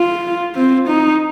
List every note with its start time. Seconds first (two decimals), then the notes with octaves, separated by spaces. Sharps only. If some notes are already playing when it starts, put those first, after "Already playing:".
Already playing: F4
0.55 C4
0.88 D#4